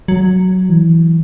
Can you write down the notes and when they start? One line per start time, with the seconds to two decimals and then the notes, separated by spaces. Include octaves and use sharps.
0.08 F#3
0.69 E3